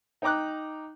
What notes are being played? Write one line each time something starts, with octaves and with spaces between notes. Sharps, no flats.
D#4 G5 A#5 D6 F#6